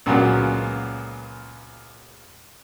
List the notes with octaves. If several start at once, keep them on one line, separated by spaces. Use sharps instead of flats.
C#2 A#2 C#3 F#3 A#3 B3